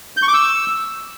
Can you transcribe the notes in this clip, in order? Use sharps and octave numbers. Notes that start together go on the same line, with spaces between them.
G6
C#6
D6
E6